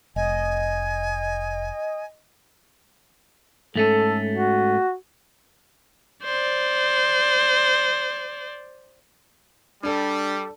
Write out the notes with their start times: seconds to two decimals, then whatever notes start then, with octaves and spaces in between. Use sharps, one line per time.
0.16 F1 D#5 G#5
3.75 G#2 A3 C#4 A4
4.32 F#4
6.24 C5 D5
9.83 G3 D4 A4 D5